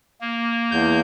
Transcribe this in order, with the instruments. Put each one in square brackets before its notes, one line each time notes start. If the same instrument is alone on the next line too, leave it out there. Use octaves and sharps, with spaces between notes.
[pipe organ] A#3
[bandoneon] E2 G6